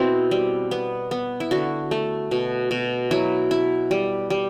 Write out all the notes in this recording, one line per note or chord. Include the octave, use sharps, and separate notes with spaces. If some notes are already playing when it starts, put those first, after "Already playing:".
Already playing: B2 C4 E4
G3
B3
B3
E4
D3 F#4
A3
B2
B2
F#3 E4
E4
G3
G3